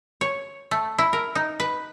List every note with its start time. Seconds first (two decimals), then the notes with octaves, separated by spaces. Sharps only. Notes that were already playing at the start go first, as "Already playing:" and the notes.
0.21 C#5
0.71 A3
0.98 E4
1.13 A#4
1.35 D#4
1.60 B4